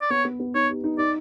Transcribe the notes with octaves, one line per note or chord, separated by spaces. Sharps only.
D5
B3 C#5
B3
B3
D#4 C#5
G4
D#4
D#4 D5